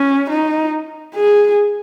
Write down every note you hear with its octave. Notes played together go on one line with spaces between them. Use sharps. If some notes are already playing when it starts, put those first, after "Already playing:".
Already playing: C#4
D#4
G#4